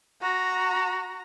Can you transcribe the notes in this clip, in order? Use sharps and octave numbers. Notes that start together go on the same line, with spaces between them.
F#4 A#5